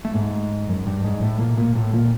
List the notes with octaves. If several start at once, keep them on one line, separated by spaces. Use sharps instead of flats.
A3
G#2 G#3
F#2 F#3
G2 G3
G#2 G#3
A2 A3
A#2 A#3
A#2 A#3
A2 A3
A#2 A#3